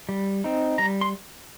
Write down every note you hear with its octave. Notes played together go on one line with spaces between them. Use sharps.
G3
C4 D#4
G3 A#5
C6